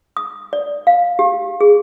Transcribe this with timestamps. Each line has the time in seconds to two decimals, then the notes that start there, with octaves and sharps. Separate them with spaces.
0.17 D#6
0.53 D5
0.87 F5
1.19 G4
1.61 G#4